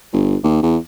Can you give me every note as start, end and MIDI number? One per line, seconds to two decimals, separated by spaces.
0.13 0.36 31
0.44 0.58 39
0.63 0.77 40